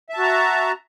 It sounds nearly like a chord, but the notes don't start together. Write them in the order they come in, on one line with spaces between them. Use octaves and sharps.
E5 A5 F#4 A#5